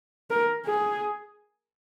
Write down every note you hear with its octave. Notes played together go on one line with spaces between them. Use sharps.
A#4
G#4